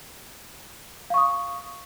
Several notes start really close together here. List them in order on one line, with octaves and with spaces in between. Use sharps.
F5 C#6 D#6